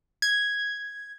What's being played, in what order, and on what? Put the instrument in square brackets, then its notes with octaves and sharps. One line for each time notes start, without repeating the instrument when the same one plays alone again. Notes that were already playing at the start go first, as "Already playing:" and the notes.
[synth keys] G#6